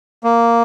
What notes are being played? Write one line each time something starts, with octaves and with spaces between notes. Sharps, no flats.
A#3